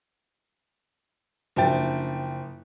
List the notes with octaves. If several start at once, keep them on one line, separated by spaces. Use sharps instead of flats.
F#1 F3 D4 E5 G5 A6